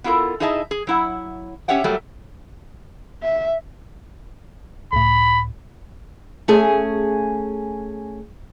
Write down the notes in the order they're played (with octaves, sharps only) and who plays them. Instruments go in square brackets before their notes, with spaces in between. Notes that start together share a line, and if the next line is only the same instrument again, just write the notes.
[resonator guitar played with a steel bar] B3 E4 F4 A4 A#4
D#4 E4 G#4 D#5 E5 A5
G#4
F#3 E4 F#5
C#4 G4 C#5 E5 F#5 G5
F#3 G3 A3 A#3
[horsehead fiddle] E5
[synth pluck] C#2 A2 [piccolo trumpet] B5
[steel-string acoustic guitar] A3 C#4 G#4 G#5